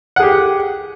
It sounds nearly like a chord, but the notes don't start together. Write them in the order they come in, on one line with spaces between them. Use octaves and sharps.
F#5 G#4 G4